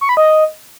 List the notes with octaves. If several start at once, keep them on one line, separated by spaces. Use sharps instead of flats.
C#6
B5
D#5